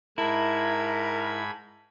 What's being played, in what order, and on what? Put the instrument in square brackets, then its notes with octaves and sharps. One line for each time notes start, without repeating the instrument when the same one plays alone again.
[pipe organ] G#2 B5 G#6 [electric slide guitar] E4 [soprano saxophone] A#4 [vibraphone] A5